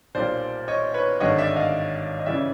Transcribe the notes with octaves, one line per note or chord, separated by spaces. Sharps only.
B1 A#2 G3 C5 D5
C#5 D#5
B4 C#5
G#1 G2 D3 G3 C#5 D#5
D5 E5
D#5 F5
D#5
C#3 E3 G3 D5 E5